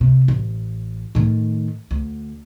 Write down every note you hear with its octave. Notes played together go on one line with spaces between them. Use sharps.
C3
A1
A2 D#3
D2